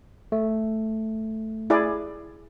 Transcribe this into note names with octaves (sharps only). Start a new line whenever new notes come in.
A3
E4 G#4 D5